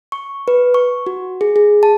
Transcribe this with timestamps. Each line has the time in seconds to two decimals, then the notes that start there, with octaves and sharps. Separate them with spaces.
0.12 C#6
0.48 B4
0.74 C#6
1.06 F#4
1.41 G#4
1.56 G#4
1.83 A5